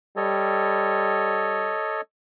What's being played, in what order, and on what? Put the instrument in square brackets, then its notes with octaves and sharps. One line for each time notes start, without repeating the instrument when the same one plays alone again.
[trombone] G3 [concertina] A4 C#5 D#5